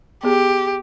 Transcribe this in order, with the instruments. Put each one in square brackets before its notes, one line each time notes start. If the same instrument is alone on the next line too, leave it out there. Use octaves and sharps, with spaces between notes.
[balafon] B3 G#4 [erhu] G4